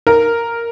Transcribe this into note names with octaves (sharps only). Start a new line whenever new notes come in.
A#4